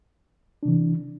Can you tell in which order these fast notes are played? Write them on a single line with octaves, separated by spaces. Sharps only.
D4 C3 E3